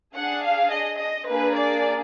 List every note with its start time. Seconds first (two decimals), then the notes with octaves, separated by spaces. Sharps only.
0.15 D4 G#4 F#5
0.43 F5
0.71 D#5
0.99 D#5
1.28 A#3 D4 G#4 B4
1.56 D5